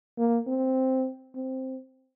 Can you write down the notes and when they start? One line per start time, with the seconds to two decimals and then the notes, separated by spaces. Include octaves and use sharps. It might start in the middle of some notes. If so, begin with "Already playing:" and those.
0.18 A#3
0.47 C4
1.35 C4